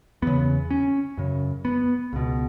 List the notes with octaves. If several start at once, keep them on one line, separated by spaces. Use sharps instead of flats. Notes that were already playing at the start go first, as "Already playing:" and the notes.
E2 C#3 B3
C#4
F#2 C#3
B3
C#2 B2